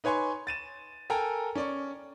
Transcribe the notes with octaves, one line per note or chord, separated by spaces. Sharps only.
D#4 B4 C#5 G#5 C6 C#6
A6 D#7 E7
A4 A#4 G5 G#5 A#5
C#4 D5 C#6